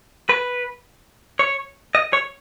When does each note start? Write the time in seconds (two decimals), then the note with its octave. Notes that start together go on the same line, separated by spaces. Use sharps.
0.29 B4
1.39 C#5
1.95 D#5
2.13 C#5